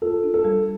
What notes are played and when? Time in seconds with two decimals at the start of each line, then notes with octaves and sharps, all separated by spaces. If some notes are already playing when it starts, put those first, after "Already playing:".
0.02 F4 A4
0.24 D4
0.34 A4
0.45 G3